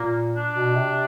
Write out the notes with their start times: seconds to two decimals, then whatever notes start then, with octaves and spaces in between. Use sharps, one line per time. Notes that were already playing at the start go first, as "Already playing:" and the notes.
Already playing: A#2 A#3
0.36 D4
0.55 B2
0.75 C3